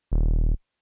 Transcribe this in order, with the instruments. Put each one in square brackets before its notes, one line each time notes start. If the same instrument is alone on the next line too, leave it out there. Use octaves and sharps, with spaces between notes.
[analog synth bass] D#1